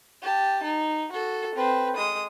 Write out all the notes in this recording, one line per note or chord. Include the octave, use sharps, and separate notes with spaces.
G4 A5
D#4
F#4 A4
C4 B4
G#3 D#6